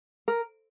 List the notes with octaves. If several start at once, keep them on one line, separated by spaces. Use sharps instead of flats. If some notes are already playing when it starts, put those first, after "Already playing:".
A#4